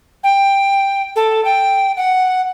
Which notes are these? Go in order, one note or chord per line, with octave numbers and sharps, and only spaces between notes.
G5
A4
G5
F#5